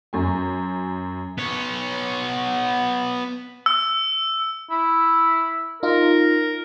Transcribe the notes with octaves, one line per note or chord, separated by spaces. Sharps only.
F#2 G#5
B3 C#5
E6
E4
D#4 F4 A#4